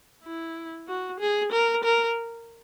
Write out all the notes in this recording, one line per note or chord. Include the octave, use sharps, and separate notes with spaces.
E4
F#4
G#4
A#4
A#4